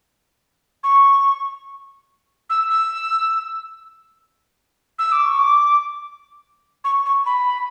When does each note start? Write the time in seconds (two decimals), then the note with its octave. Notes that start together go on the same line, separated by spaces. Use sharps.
0.84 C#6
2.50 E6
2.69 E6
4.99 E6
5.12 D6
5.25 C#6
5.39 D6
6.84 C#6
7.06 C#6
7.26 B5